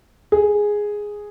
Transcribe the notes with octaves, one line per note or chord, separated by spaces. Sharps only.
G#4